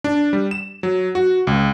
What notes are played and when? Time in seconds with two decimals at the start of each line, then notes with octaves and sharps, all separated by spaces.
0.04 D4
0.33 G3
0.51 E7
0.83 F#3
1.15 F#4
1.47 C#2